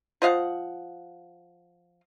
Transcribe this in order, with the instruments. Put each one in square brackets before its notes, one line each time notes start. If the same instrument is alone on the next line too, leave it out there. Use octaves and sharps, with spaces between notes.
[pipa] F3 D#5 F5 F#5